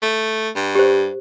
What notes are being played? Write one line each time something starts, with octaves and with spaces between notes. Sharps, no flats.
A3
G2
G4 C5